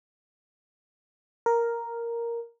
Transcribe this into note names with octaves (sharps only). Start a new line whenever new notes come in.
A#4